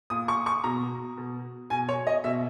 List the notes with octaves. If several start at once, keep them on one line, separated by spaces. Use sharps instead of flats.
A#2 D#6
C#6
C#6
B2 A#5
B2
B2 G#5
C#5
D#5
B2 E5